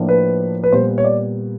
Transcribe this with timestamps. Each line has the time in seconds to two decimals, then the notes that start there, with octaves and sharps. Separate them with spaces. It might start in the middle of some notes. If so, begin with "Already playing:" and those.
Already playing: A2 F3 A#3 D4
0.09 B4
0.64 B4
0.72 A#2 G3 B3 C5
0.98 C#5
1.04 D5